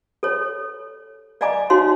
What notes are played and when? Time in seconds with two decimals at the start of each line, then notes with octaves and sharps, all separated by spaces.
0.23 A4 C#5
1.41 D5 D#5 F5 G#5 A#5 D6
1.70 D#4 F#4 C#5 F5 C6